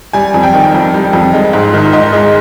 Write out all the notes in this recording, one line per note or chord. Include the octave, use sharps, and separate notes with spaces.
G3 G#5
F2
G5
D#3
F2
G3
F2
G#3
G#2
D#3
G#2 D#5
G#3